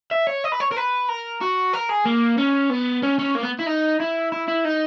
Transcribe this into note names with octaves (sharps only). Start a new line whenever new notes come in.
E5
C#5
D#5
B4
C#5
A#4
B4
A#4
F#4
A#4
G#4
A#3
C#4
B3
C#4
C#4
A#3
B3
E4
D#4
E4
E4
E4
D#4